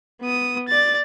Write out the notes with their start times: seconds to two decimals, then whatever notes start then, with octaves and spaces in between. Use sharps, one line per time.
0.21 B3 D#6
0.68 D5 A6